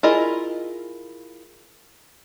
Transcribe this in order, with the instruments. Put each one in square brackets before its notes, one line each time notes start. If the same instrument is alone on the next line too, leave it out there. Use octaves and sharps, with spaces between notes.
[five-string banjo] E4 F4 G#4 A#4 D#5